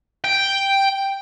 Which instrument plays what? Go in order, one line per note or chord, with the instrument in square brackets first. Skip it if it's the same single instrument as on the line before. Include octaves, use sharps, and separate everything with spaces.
[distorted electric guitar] G5